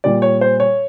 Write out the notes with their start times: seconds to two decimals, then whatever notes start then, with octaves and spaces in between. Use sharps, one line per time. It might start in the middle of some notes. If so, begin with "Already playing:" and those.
0.04 A#2 G3 D5
0.22 C#5
0.41 C5
0.60 C#5